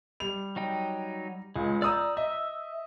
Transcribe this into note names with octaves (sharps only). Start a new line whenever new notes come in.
G3 F7
F#3 D#4 G5
C#2 G#3
D5 A#5 D#6 E6 G6
D#5 E5 E6